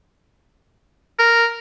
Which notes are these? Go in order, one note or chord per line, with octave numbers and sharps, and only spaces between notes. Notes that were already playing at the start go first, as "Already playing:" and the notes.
A#4